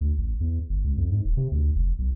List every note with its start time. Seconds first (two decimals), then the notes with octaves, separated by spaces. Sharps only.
0.01 D2
0.18 A1
0.40 E2
0.69 G1
0.84 C#2
0.98 F2
1.11 G#2
1.25 D#1
1.37 C3
1.51 D2
1.75 F1
1.98 B1